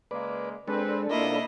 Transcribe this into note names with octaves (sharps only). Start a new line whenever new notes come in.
C#3 G#3 A#3 B4 D5
G#3 C4 D4 A4 B4
C3 A#3 E4 F4 A#4 D#5